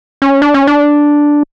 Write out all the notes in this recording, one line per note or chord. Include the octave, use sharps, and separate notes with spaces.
C#4
D4
C#4
D4